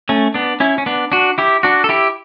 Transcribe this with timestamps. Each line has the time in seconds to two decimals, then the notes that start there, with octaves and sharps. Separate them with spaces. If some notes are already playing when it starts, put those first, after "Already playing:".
0.09 A3 C#4
0.34 B3 D4
0.60 C#4 E4
0.78 C#4
0.86 B3 D4
1.12 D4 F#4
1.38 E4 G4
1.63 D4 F#4
1.84 A4
1.89 E4 G4